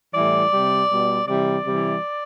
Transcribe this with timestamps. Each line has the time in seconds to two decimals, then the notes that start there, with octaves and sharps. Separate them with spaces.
0.13 A2 E3 G3 D5
0.52 C3 G3
0.89 B2 G3
1.27 C3 E3 G3 D5
1.65 C3 E3 G3